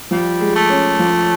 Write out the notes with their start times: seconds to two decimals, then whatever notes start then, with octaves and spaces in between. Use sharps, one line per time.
0.11 F3 G3
0.41 G#3
0.56 A3
0.70 C#4
0.99 F3